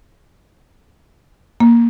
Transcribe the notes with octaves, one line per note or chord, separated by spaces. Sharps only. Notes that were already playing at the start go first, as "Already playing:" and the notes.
A#3